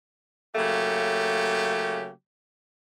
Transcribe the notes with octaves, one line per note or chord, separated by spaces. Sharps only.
C#3 F#3 A3 A#3 G4